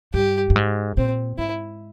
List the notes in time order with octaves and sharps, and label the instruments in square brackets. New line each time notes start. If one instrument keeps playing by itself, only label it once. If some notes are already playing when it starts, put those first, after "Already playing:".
[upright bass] G2 [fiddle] G4
[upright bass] G2
G#2
[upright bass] A#2 [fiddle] C4
[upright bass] G#2 [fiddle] E4